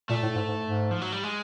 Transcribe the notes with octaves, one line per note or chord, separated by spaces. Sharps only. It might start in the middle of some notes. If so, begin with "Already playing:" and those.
A#2 A3
A2
G#2
G#2
G#2
F3
F#3
G3
G#3